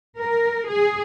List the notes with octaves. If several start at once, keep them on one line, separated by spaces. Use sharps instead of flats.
A#4
G#4